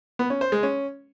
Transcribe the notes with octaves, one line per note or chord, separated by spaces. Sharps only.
B3
C#4
C5
G#3
C#4